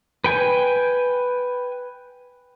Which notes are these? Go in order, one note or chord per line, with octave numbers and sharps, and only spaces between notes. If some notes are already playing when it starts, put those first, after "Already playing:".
B4 G5 G#5